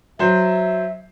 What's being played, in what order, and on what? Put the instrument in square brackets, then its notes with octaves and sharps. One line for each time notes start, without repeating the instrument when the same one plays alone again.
[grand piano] F#3 C5 [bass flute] E5